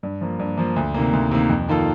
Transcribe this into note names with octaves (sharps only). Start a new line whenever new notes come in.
G2
F3 A#3
G2
F3 A#3
D2
C3 D#3 A#3
D2
C3 D#3 A#3
F2
D#3 A#3 F4 A4